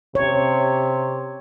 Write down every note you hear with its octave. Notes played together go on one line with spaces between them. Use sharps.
C3 C#5